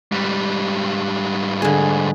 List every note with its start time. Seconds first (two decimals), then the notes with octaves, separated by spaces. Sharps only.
0.12 G#2 G3
1.62 D3 G#4